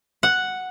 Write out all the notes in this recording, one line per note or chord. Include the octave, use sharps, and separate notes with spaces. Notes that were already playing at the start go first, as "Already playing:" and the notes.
F#5